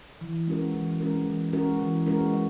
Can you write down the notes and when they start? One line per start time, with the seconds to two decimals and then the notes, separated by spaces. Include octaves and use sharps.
0.21 E3
0.47 G#3 C#4 F#4 A#4
0.74 E3
1.00 G#3 C#4 F#4 A#4
1.26 E3
1.53 G#3 C#4 F#4 A#4
1.79 E3
2.06 G#3 C#4 F#4 A#4
2.33 G#3